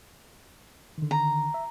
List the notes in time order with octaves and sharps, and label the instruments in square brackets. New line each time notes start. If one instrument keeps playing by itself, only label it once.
[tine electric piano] D3 D#3
[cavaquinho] A#5
[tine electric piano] E5